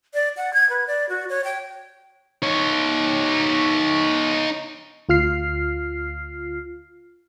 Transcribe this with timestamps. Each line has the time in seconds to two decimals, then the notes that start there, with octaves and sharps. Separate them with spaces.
0.14 D5
0.37 F#5
0.54 G#6
0.70 B4
0.87 D5
1.09 F#4
1.29 C#5
1.44 G5
2.43 D#4 C#5
5.09 D2 F4 F6 C7